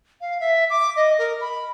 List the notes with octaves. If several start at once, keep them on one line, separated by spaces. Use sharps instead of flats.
F5
E5
D6
D#5
A#4
B5